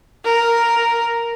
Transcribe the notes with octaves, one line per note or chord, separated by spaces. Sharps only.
A#4